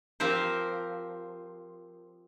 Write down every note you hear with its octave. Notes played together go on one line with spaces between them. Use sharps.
F3 C4 G4 A#4 C5